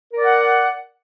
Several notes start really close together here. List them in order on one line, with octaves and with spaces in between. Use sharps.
A#4 D5 F#5